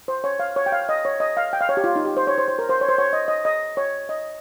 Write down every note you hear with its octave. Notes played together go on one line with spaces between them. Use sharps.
C5
C#5
F5
C#5
G5
F5
D#5
C#5
D#5
F5
G5
F5
C#5
G4
F4
D#4
G4
C5
C#5
C5
C5
A#4
C5
C#5
C5
C#5
D#5
D#5
D#5
C#5
D#5